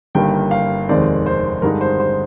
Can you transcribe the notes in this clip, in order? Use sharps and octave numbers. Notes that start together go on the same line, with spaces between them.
G1 G2 D#3 A#3 G5
F5
F1 D#2 D#3 G#3 C4 D5
C5
G2 D3 G#3 D#4 A#4
C5
C5